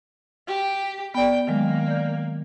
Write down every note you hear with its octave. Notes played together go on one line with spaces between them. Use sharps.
G4
B3 D5 G5
D#3 F#3 G#3 A#3
D5 G6